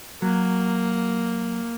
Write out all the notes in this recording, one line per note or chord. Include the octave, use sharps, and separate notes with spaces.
F#3 A#3